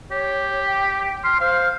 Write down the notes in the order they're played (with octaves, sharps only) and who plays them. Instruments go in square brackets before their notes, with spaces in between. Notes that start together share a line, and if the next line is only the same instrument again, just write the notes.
[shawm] G4 [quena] C#5
[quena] G5
[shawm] C6 [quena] F6
[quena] C5 [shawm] F5